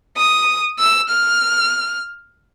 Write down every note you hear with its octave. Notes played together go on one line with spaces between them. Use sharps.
D#6
E6
F6